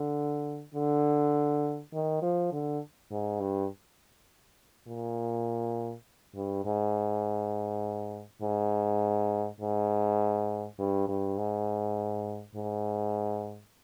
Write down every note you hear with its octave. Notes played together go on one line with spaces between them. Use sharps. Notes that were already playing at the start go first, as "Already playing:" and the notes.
Already playing: D3
D3
D#3
F3
D3
G#2
G2
A#2
G2
G#2
G#2
G#2
G2
G2
G#2
G#2